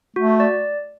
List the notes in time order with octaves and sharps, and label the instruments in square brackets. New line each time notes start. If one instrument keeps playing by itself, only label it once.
[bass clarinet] A3 [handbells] F#4
[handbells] D5